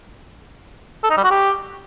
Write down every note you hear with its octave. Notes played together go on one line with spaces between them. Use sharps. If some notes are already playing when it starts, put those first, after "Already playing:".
A4
D#4
G3
F#4
G4